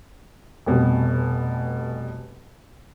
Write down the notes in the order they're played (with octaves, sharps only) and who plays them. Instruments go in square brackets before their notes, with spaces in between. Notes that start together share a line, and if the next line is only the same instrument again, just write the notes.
[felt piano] F1 B2 G3